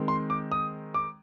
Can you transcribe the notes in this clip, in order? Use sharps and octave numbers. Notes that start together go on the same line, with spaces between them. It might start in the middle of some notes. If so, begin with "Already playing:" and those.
Already playing: D#3 G#3 C4
C6
D6
D#6
D6